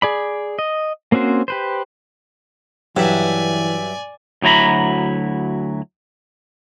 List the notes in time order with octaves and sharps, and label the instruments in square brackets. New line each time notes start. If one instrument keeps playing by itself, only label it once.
[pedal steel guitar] G#4 D5 B5
D#5
A#3 C4 C#4 F#4 C5
G4 B4 C5
[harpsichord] G2 [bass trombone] E3 [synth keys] F#3 E5 [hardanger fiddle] D5 G#5
[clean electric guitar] D2 F#3 E4 A#5 B5